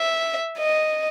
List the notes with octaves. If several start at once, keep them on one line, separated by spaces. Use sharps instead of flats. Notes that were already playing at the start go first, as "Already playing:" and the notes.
Already playing: E5
D#5